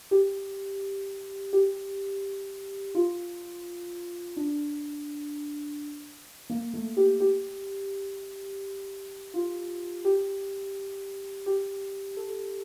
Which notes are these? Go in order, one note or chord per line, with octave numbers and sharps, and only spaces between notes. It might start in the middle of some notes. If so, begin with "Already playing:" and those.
G4
G4
F4
D4
A#3
A3
G4
G4
F4
G4
G4
A4